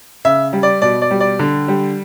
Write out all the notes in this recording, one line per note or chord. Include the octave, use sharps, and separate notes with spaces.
C#3 E5
G3
D5
B2 D5
D5
G3
D5
D3
G3